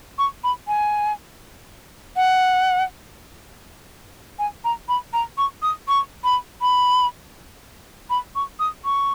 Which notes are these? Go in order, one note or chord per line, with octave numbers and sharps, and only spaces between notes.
C#6
B5
G#5
F#5
G#5
A#5
B5
A#5
C#6
D#6
C#6
B5
B5
B5
C#6
D#6
C#6